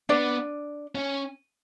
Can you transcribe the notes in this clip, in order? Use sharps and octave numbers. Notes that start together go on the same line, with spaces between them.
B3 D4 D5
C#4